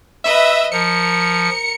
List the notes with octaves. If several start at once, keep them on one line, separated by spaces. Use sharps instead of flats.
B4 D#5 E5
F3 A#4 C#7